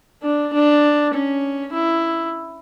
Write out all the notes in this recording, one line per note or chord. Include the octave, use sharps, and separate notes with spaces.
D4
D4
C#4
E4